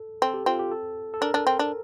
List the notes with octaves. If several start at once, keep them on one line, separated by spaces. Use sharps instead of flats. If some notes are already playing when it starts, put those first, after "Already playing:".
Already playing: A4
C4 A4
G4
C4 F4
G4
A4
A4
D4 A#4
D4
C4
D4